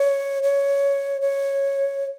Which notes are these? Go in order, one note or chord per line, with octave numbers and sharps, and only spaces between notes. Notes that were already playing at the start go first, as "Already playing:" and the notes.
Already playing: C#5
C#5
C#5